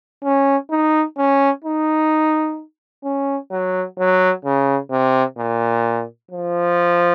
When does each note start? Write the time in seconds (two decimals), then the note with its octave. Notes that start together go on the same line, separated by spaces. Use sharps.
0.24 C#4
0.71 D#4
1.17 C#4
1.64 D#4
3.04 C#4
3.51 F#3
3.98 F#3
4.45 C#3
4.91 C3
5.38 A#2
6.31 F3